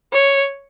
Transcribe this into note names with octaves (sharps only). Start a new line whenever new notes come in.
C#5